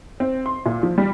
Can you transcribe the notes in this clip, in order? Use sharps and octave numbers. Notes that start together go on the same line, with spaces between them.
C4
C6
A#2
F3
G3